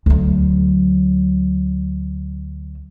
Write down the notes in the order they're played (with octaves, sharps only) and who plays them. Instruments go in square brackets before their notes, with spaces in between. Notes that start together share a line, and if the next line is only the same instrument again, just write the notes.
[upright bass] D2 F#3